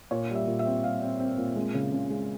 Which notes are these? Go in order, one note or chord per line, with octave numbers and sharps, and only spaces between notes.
A#2 C#5
G3
E5
A#2
E5
C4
G3 F5
C4
C4
A#2
G#3
C#3
C#3
G#3